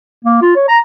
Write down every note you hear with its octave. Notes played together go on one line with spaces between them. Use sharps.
A#3
F4
C#5
A#5